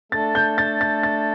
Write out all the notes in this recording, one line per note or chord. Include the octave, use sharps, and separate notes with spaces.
A3 D4 A4 A6
G6
A6
A6
A6